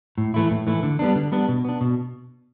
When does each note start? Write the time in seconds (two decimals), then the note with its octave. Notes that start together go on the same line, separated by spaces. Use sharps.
0.18 A2
0.34 E3 A3 E4
0.51 A2
0.67 E3 A3 E4
0.83 D3
0.99 G3 B3 D4
1.16 D3
1.32 G3 B3 D4
1.49 B2
1.65 B3 D4
1.81 B2